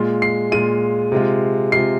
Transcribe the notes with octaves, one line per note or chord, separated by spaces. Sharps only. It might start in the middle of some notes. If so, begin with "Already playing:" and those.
Already playing: A#2 G#3 F4
C7
A#2 G#3 F4 D#7
C3 G#3 F4
C3 G#3 F4 C7